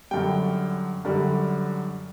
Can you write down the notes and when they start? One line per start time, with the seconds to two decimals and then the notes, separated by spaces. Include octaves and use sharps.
0.11 F#2 D3 G3 G5
1.05 F#2 D3 G3